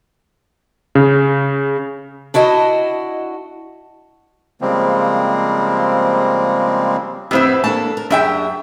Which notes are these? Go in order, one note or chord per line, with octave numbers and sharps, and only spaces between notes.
C#3
D4 E4 F#4 D#5 A5
C#3 F3 G3 G#3 A#3 C4
F2 A2 B3 C4 E4 G4
A#3 D4 A4 A5
A#4
F#2 D4 G4 G#4 E5 G5